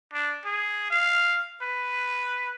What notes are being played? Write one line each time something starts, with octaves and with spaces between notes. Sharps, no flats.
D4
G#4
F5
B4